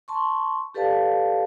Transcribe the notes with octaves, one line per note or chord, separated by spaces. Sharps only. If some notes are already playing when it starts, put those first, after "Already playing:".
A5 C6 C#6
G4 A4 B4 D5 F5 A5